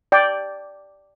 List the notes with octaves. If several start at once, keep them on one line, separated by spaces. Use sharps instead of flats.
D5 G5